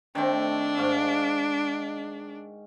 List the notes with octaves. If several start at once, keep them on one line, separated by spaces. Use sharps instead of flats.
D#3 A3 C4 D4
G#2 F5 C#6